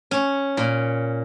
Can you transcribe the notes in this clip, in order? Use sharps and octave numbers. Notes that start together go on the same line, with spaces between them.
C#4
A#2